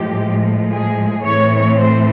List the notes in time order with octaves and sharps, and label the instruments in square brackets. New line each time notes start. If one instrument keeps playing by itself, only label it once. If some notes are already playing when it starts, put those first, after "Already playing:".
Already playing: [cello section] A2 F3 G#3 G4
G#4
A2 E3 A3 C4 C#5
C5